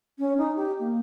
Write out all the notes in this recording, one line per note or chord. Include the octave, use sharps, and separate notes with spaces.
C#4
D#4
G4
A#3